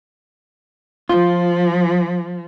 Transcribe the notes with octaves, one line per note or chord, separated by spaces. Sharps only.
F3 F4